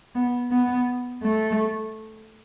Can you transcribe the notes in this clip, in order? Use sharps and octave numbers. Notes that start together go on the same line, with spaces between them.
B3
B3
A3